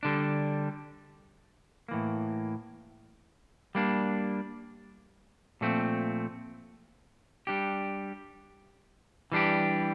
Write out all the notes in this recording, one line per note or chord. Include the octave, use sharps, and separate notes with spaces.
D3 G3 D4
A2 E3 A#3
G3 A#3 D4
A#2 F3 A3 C4
G3 D4 G4
E3 G3 D4 G4